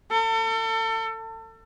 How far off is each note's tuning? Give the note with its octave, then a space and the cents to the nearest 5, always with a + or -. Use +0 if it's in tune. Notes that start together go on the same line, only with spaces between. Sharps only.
A4 +35